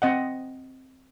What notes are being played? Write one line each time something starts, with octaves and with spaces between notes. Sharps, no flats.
C4 D#5 F#5